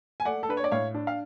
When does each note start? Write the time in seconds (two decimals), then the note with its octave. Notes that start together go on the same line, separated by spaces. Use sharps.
0.20 G#5
0.25 A3 D5 F#5
0.43 A4
0.49 D4 B4
0.57 C#5
0.64 D5
0.72 A2 C#5 F5
0.94 D4
1.07 F5